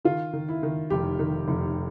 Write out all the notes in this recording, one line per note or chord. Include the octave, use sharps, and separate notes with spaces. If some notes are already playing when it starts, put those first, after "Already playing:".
D#3 F4
D#3
E4
D#3
F1 G4
D#3
F1